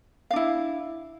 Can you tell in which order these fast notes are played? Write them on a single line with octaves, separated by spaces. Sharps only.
F5 D4 E4